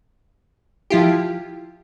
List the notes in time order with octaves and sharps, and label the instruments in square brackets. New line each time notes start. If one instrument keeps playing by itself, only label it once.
[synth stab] F3 E4 F4 G4